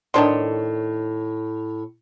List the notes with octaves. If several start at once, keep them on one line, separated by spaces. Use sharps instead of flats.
A2 D#3 D4 C#5 C6